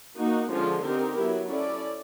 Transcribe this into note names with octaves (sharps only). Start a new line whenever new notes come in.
A#3 D#4 F#4
D3 F3 G#3 C#4 F4
C4 D#4 G4 A#4
F#3 B3 E4
C#4 E4 A4 D5